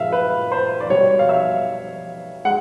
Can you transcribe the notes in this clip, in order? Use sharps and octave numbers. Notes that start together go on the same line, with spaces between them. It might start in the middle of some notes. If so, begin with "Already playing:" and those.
Already playing: A#2 G#3 E5 F5
B4
C5
D5
B2 G3 C#5
F5
E5
G#3 F#5